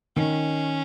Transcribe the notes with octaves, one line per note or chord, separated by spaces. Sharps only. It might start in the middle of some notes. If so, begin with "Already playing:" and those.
D#3 C#4